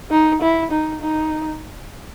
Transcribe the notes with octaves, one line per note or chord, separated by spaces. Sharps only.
D#4
E4
D#4
D#4